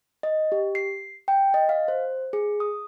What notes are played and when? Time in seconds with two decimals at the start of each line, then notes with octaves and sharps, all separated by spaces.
0.23 D#5
0.52 G4
0.75 C7
1.28 G5
1.54 D#5
1.69 F5
1.88 C5
2.33 G#4
2.60 D#6